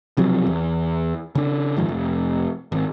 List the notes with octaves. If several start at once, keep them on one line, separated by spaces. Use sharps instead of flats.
B1 C3 F3 F#3
E2
C#3 D4
F#1 G#2 D#3 F3
F1
G#1